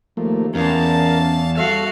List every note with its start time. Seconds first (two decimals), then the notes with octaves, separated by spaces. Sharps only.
0.17 D#2 F3 A3 A#3
0.55 E2 C#4 A#4 F5 A5
1.57 G3 F#4 A4 E5 F5